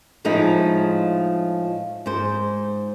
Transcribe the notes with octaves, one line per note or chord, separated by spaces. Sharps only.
A2 F3 G#3 D#4 E4
G#2 C5